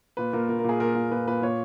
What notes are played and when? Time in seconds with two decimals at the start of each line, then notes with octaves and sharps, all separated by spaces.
0.17 A#2 B4
0.33 A#2 A#4
0.49 A#2 A#4
0.59 A#4
0.64 A#2 G#4
0.80 A#2 A#4
0.95 A#2
1.11 A#2 B4
1.28 A#2 B4
1.42 A#2 C#5